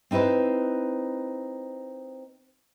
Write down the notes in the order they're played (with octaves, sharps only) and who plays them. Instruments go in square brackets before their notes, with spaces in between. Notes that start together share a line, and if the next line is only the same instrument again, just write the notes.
[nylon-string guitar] C4 D#4 E4 B4 C5